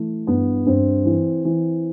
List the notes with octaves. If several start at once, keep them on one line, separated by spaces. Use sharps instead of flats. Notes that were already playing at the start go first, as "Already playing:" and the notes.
Already playing: E3 A3
G2 B3
G2 C4
E3
E3